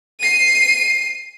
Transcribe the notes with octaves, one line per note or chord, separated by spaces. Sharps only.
C7 D#7